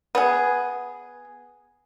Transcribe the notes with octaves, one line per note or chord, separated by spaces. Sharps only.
B3 G#4